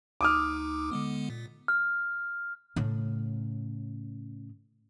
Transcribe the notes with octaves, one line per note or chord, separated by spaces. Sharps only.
D2 D#4 D6 D#6 F6
D3 G#3 B3
A#2
F6
A2 C#3